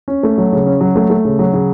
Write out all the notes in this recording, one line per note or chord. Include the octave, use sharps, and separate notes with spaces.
C#4
A3
F#3
C#3
C#4
F#3
A3
A3
C#3
F#3
C#3